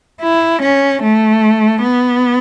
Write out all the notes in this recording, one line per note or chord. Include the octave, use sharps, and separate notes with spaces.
E4
C#4
A3
B3